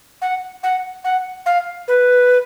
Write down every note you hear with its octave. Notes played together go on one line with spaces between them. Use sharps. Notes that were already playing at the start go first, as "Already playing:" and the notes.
F#5
F#5
F#5
F5
B4